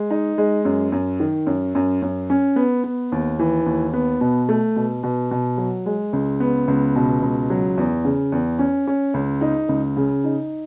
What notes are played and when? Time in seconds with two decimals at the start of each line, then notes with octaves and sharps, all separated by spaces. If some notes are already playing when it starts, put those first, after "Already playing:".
Already playing: G#3
0.11 D#4
0.38 G#3
0.65 F#2
0.92 F#2
1.20 D#3
1.47 F#2
1.75 F#2
2.02 F#2
2.30 C#4
2.56 B3
2.84 B3
3.12 D#2
3.39 E3
3.66 D#2
3.93 B3
4.21 B2
4.49 A3
4.76 B2
5.03 B2
5.31 B2
5.58 F#3
5.86 G#3
6.13 C#2
6.40 B3
6.68 C#2
6.95 B2
7.22 C#2
7.50 F#3
7.78 E2
8.05 C#3
8.32 E2
8.59 C#4
8.87 C#4
9.14 C#2
9.41 D#4
9.69 C#2
9.97 C#3
10.24 D#4